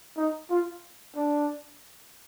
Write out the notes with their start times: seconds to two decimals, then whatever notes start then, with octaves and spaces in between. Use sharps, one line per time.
0.17 D#4
0.50 F4
1.16 D4